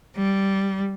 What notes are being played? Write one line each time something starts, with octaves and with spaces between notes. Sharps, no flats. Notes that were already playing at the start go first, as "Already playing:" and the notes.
G3